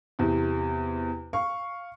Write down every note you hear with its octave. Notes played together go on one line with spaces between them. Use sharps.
E2 C3
F5 C#6